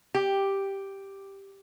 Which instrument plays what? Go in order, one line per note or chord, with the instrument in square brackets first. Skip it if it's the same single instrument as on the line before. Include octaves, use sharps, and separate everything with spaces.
[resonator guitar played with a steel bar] G4